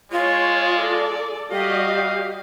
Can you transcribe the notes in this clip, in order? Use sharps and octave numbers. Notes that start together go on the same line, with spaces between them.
G#3 F4 C#5
A4 D5
G3 F#4 G4 D#5 F5